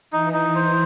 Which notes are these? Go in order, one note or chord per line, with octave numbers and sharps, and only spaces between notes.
E3 D#4
D#4
C5